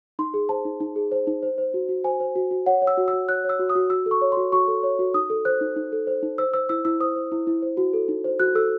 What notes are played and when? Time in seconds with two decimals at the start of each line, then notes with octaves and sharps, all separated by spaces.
0.19 D#4 C6
0.34 G#4
0.49 C5 A5
0.65 D#4
0.80 D#4
0.96 G#4
1.12 C5
1.27 D#4
1.43 C5
1.58 C5
1.74 F#4
1.89 F#4
2.04 C5 G#5
2.20 C5
2.35 F#4
2.51 F#4
2.66 C#5 F#5
2.82 C#5
2.87 E6
2.97 F#4
3.08 E6
3.13 F#4
3.28 C#5 F#6
3.44 C#5
3.49 E6
3.59 F#4
3.70 D#6
3.75 F#4
3.90 F#4 E6
4.06 A4
4.11 C#6
4.22 C#5
4.32 C6
4.37 F#4
4.52 F#4 C#6
4.68 A4
4.83 C#5
4.99 F#4
5.14 D#4 D#6
5.30 A4
5.45 C5 F#6
5.61 D#4
5.76 D#4
5.92 A4
6.07 C5
6.23 D#4
6.38 C5 E6
6.54 C5 E6
6.69 E4 E6
6.85 E4 E6
7.00 C5 D#6
7.16 C5
7.32 E4
7.47 E4
7.62 C5
7.77 F#4
7.93 A4
8.08 D#4
8.24 C5
8.40 F#4 F#6
8.55 A4 E6